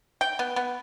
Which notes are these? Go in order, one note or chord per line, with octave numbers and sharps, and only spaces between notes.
G5
B3
B3